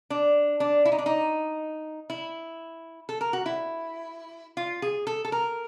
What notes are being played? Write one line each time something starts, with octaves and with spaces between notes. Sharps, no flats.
D4
D4
E4
D#4
D4
D#4
E4
A4
A#4
F#4
E4
F4
G#4
A4
A4
A#4